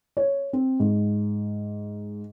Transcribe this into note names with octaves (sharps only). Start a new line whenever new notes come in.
C#5
C4
G#2